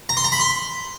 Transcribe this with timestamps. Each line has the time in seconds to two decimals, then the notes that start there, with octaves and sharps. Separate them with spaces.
0.09 A#5
0.17 C6
0.24 A#5
0.32 B5
0.40 C6